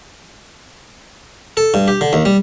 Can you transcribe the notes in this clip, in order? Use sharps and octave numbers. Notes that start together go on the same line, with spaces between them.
A4
G2
G4
D3
D#2
G3